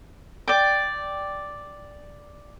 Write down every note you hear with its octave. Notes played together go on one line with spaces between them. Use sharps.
D5 G5